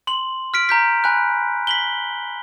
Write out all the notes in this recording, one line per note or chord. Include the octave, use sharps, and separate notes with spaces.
C6 F#7
F6 B6 D7
A#5 G6 B6
G#5 B5 F#6
B6 F#7 G7